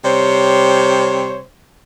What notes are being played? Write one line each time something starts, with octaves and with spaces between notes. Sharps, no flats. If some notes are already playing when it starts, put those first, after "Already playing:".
C3 G3 C5 C#5